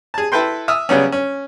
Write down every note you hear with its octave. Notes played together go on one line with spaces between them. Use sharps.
G#4 A5
E4 A4 B4 G5 C6
E5 D#6 F6
C#3 F#3 G3 B3 C#4
C#4